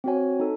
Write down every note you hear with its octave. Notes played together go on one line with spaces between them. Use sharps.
C4 F#4 C#5 G#5
D#4 A4